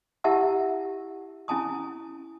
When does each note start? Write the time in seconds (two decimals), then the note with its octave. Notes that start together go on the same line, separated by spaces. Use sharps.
0.24 E4 G4 E5 F#5 A5 E6
1.48 C#4 E4 G#5 A5 D#6